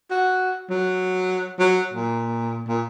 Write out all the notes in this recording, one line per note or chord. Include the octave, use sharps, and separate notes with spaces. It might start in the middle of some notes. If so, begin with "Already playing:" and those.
F#4
F#3
F#3
A#2
A#2